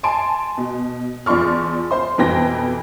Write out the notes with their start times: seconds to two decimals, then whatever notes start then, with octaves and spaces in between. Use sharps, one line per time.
0.03 G#5 A5 C6 D7
0.57 B2
1.26 E2 F3 D5 C6 C#6 F6
1.91 C5 C6
2.18 F2 B2 E3 G5 A#6